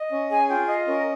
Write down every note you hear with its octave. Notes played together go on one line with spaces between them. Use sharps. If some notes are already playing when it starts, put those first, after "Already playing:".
Already playing: D#5
C#4
G#4 G#5
F4 G5
D#5 F5
C#4 A#4